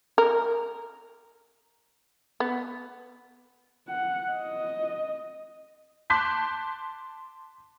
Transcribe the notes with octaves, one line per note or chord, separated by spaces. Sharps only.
A#4
B3
F#5
D#5
A5 C6 D6 F#6 G6 B6